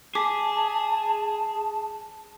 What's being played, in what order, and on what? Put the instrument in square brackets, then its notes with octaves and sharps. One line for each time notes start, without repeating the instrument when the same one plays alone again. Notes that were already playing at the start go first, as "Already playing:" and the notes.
[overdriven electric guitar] G#4 [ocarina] A5 [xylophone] D6 B6